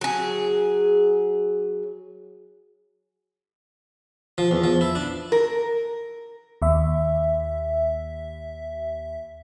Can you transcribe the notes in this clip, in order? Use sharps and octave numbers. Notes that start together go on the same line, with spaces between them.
F#3 G#4
F3
E2
F3
E4
D4
A#4
D#2 E5